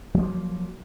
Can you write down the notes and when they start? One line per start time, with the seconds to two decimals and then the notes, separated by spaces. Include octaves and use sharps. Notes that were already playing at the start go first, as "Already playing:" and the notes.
0.14 F#3
0.19 F3
0.23 A#3